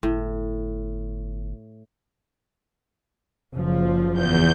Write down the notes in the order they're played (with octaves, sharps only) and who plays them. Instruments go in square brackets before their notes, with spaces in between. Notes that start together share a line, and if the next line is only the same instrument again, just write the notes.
[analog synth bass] G1 [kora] A2
[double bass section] F#1 F3
[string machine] E2 G6